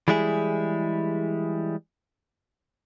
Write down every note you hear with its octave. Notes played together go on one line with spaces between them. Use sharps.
E3 G3 G#3 E4 G#4